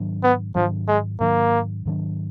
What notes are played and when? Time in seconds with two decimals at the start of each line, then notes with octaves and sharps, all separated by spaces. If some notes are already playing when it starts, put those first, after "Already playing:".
Already playing: G#2 D#3 F#3 D4
0.23 B3
0.55 G#2 D#3 F3 F#3 D4
0.88 G#3
1.20 G#2 D#3 F#3 A#3 D4
1.85 G#2 D#3 F#3 D4